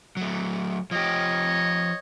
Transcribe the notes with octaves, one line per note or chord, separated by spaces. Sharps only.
F#3 A3
F3 G4 C#5 D#5